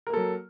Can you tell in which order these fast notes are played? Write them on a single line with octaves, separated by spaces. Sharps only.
A#4 A#3 A4 F#3